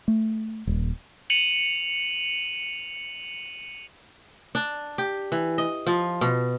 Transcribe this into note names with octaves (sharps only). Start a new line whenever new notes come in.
A3
D#1
C#7 D#7 F7 F#7
D4
G4
E3
D#5
F3
B2